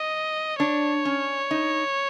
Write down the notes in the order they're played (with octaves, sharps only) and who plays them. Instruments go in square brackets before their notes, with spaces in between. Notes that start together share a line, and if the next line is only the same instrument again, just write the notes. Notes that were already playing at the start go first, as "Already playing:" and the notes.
Already playing: [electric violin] D#5
[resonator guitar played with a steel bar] D4 [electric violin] C#5
[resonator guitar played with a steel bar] C#4
D#4